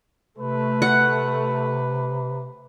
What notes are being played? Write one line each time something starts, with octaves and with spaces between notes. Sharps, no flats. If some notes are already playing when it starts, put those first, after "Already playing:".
C3 A3 B4
F#5